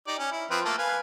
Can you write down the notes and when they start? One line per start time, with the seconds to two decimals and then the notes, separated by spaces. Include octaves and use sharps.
0.07 D#4 G4 D5
0.19 C#4
0.31 E4
0.50 F3 C4 B4
0.65 A3 A#3 A4
0.78 B4 F5 G#5